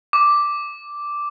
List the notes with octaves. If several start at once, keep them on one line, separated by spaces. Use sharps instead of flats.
D6